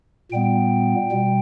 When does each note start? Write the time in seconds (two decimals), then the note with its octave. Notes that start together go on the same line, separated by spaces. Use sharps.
0.31 A#2 G3 B3 G5
1.11 B2 G3